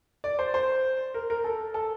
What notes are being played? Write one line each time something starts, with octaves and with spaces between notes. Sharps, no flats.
D5
C5
C5
A#4
A#4
A4
A4